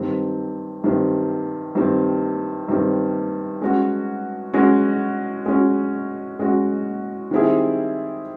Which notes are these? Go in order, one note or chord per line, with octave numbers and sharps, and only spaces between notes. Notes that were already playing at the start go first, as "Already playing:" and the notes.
Already playing: G2 D#3 G3 C4
G2 D#3 G3 C4
G2 D#3 G3 C4
G2 D#3 G3 C4
G#3 C#4 F#4
G#3 C#4 F#4
G#3 C#4 F#4
G#3 C#4 F#4
D#3 G3 C4 E4 G#4